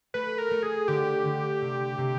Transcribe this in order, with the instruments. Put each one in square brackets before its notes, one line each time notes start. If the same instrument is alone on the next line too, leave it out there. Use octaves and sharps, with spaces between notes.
[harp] A3 [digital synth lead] B4
[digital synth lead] A#4
[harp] A3
[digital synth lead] G#4
[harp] D3 [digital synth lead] G4
[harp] D3
C3
C3